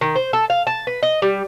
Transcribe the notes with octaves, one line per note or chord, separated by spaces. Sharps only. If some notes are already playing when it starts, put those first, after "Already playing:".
D#3
C5
A4
F5
A5
B4
D#5
G3